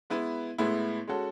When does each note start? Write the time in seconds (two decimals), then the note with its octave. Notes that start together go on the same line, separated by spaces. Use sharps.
0.10 G#3 B3 E4 B4
0.58 A2 G#3 B3 E4
1.07 G#3 C#4 F#4 A4